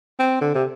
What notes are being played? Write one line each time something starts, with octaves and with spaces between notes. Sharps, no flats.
C4
D3
C3